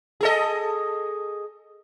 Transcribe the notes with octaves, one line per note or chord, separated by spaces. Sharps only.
G#4 A4 D#5